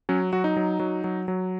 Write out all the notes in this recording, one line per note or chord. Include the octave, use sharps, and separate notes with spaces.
F#3 C#4
F#3 F#4
D#4
F#3
F#3
F#3
F#3